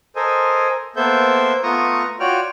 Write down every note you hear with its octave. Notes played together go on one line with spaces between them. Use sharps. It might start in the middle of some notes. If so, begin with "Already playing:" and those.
A4 A#4 C5 D#5 G#5
A#3 B3 A4 C5 E5 G6
A3 B3 F4 A#5 C#6 D#6
F4 F#4 C#5 D5 G5 F6